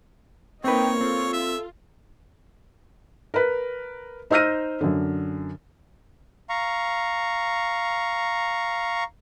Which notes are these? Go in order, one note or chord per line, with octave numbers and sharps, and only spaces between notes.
A#3 C4 D#4 B4 C#5 G5
C4 F4 A4
E5
A#4 B4
D#4 C5 E6 F6 A#6 D#7
F#2 D3
F5 A#5 C#6